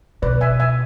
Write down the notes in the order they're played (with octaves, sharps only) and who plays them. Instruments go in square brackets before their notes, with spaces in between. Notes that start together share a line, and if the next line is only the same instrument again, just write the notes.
[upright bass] B2 [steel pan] B4 D5
[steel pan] E5 G#5
E5 G#5